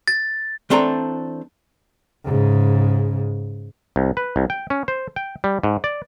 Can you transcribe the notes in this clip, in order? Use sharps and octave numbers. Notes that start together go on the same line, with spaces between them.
A6
E3 A3 C4 D4 A4 A#5
G#2 C#3
C2
B4
C2
G5
C#4
C5
G5
G3
G#2
D5